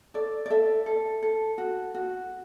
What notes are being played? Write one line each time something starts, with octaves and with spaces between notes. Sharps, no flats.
A4 D5
D5
A4 E5
A4
A4
F#4
F#4